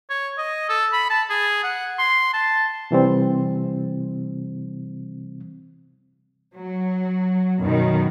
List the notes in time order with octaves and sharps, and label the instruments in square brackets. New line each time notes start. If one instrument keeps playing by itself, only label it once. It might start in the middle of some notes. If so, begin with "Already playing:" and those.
[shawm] C#5
D#5
A4
B5
A5
G#4
F#5
C6
A5
[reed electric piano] C3 E3 G3 C4
[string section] F#3
F#2 B2 D#3